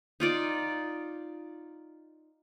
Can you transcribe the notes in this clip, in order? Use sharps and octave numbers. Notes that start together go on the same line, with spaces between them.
D#4 F4 D5